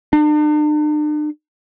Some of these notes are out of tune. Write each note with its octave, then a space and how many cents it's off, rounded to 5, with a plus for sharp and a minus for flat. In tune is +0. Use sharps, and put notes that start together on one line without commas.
D4 +45